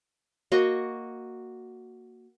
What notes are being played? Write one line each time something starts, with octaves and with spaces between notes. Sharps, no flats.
A#3 F#4 D#5 C#6